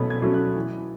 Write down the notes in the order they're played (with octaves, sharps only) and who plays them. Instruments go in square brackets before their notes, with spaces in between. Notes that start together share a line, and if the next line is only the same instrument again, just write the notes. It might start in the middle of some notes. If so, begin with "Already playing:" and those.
Already playing: [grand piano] B2 F#3 A3 C#4 B5
G#6
F#3 A3 C#4
F#6
E3